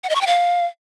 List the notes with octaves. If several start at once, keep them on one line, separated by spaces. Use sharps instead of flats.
F#5
D#5
C#6
G5
F5